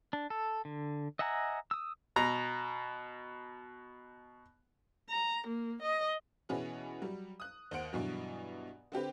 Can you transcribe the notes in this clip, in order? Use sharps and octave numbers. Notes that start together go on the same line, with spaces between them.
D4
A4
D3
D#5 E5 F#5 G#5 A#5
D#6 E6
B2 A#5
A#5
A#3
D#5
B2 E3 C#4 F#4 G#4 B4
F#3 G3
D#6 F#6
D#2 C5 F#5 D7
G2 B2 E3 F#3
D3 C4 G4 B4